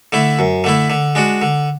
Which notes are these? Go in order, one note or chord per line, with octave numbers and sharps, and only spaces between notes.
D3 A3 E4
F#2
D3 A3 E4
D3
G#3 D4 F#4
D3